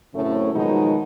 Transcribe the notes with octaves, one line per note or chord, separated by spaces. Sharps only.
F#2 A2 C#3 A3 C4 C#4
B2 D#3 F3 F#3 G#3 D#4